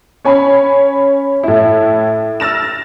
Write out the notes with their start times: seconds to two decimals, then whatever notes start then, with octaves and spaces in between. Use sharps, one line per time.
0.25 C#4 C#5 G#5 B5
1.43 A2 E4
2.40 E6 F6 A6 A#6 E7